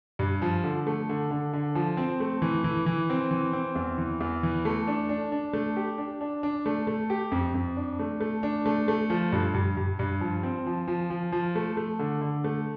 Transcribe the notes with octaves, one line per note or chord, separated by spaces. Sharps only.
G2
F3
D3
A3
D3
D3
D3
F3
C4
A3
E3
E3
E3
C4
E3
C4
E2
E3
E2
E3
A3
D4
D4
D4
A3
G4
D4
D4
D4
A3
A3
G4
F2
F2
D4
A3
A3
D4
A3
A3
F3
G2
G2
G2
G2
F3
C4
F3
F3
F3
F3
A3
A3
D3
D3
A3